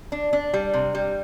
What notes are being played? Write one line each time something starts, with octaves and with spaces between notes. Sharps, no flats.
D4
D4
G3
C3
G3